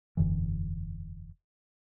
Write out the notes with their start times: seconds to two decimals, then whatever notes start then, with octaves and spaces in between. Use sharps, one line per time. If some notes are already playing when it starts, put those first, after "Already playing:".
0.17 E1 F#2 D3 E3